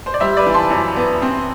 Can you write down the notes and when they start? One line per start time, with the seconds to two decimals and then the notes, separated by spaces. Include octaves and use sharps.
0.06 C5
0.14 D5
0.20 G3 C5 E5
0.37 B4 D5
0.46 E3
0.54 A5 C6
0.70 F#2
0.96 B3
1.22 C4